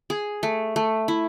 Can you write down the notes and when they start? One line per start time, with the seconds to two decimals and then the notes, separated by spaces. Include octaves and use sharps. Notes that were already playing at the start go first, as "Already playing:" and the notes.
0.10 G#4
0.43 A3
0.76 A3
1.08 E4